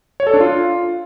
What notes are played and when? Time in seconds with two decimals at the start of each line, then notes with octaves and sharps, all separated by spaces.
0.20 C#5
0.27 A4
0.34 D4
0.40 F4